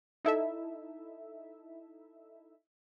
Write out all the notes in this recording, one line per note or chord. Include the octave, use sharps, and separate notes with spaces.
D#4 E4 A4 E5